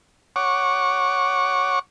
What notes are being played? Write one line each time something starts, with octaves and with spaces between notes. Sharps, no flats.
C#5 F#5 C#6 D6